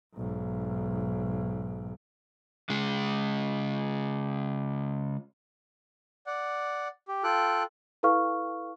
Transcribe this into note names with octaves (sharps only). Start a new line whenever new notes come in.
B1 G#2
C#3 G#3
D5 F#5
G4
F4 A4 G5 F#6
E4 A4 B4 F5 C#6 F6